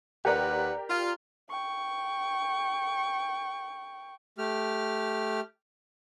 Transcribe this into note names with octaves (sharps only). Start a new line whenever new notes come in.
D#2 G4 A#4 B4 D5 F#5
F4
G5 C#6
A3 G4 F6